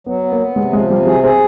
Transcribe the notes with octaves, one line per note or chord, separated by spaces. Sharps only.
F#3 B3
B3
A#3
B3
C3 G#3
F3 G#3
C3 G3
F#3 G#4
C4 G#4